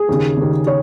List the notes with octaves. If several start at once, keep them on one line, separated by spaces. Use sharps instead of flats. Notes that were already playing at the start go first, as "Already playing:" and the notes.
Already playing: G#4
D#2 C#3
D#2 C#3
C#5